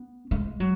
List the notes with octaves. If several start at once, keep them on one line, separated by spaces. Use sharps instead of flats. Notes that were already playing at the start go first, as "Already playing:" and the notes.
Already playing: B3
G#3
F#3